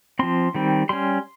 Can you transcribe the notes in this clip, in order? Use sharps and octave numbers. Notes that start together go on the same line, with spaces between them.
F3 C4 C6
D#3 G3 C4
G3 C#4 C6